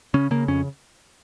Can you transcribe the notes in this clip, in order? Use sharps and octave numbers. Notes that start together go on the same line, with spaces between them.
C#3 C#4
C#3 A#3
F2 C#4